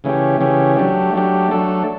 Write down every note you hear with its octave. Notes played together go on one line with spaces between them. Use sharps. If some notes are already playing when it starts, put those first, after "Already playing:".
C#3 E3 A3 C#4 G4
C#3 E3 A3 C#4 G4
F#3 A3 D4 G4
F#3 A3 D4 G4
F#3 A3 D4 A4